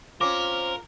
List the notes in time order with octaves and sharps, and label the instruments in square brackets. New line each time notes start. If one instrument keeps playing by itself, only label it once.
[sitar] C4 C#4 [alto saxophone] F4 [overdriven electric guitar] A#4 [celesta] D6